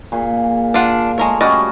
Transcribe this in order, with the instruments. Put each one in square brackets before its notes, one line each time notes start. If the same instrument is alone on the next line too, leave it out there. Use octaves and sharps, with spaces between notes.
[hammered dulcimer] A#2 G#4
[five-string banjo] D4 F4 F#5 [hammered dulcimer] F5
[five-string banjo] G#3 A#4 C#5 [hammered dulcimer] A3
[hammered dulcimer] G3 C#4 F#4 [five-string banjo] D5 D#5